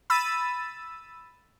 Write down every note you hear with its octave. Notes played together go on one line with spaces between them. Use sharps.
B5 E6 A6 D#7